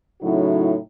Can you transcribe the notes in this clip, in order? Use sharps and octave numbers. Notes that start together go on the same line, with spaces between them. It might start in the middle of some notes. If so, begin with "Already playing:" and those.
A2 C#3 F#3 D#4 E4 F#4